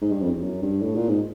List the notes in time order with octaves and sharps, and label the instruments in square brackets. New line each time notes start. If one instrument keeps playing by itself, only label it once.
[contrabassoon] G#2
G2
F2
E2
F#2
G2
A2
A#2
G#2